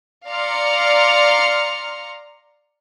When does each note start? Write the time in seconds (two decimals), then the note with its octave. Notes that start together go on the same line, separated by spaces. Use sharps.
0.29 D5 F5 A#5 C6 F6 C#7